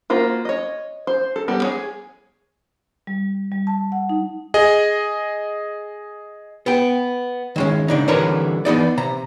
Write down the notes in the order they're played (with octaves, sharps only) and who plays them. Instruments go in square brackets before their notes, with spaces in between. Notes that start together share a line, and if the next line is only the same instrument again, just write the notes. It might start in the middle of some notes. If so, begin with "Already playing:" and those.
[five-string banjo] A#3 F4 F#4 C5
C#5 D#5
C5
A4
G3 B3
G#4 C#5
[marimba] G3
G3
A5
F#5
D#4
[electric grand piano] G#4 D#5
[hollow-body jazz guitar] B3 G5
D#3 G#3 C#4
C#3 D4 D#4
C2 D3 E3 A#4 B4 C#5
E3 B3 D#4 D5
C3 A#5